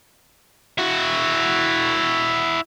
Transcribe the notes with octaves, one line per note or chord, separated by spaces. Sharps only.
E4 F#4